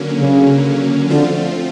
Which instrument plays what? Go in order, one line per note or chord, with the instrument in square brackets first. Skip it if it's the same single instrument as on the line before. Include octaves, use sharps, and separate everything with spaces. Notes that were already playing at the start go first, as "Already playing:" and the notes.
Already playing: [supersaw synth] D3 F#3 A#3 C#4
[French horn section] C#3
[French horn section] D3 [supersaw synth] F3 A3 C4 F4